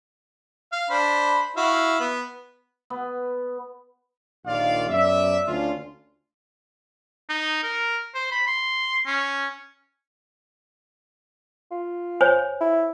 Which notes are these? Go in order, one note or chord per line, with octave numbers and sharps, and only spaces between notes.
F5
D4 C5 B5
E4 F#4 F5
B3
B3
A#1 D#2 D#3 F4 D5 F5
F#2 B2 D5 E5
D2 C#4 D4 F4
D#4
A#4
C5
B5
C6
C#4
F4
C5 C#5 G#5
E4